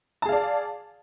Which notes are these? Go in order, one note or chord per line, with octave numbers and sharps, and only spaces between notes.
G#4 D5 F5 A5